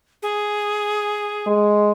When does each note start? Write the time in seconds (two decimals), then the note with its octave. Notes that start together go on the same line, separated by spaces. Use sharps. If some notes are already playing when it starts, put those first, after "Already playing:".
0.22 G#4
1.46 G#3